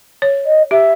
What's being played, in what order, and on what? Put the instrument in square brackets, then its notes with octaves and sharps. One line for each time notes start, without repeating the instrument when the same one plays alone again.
[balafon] C#5
[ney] D#5
[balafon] G4 [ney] E5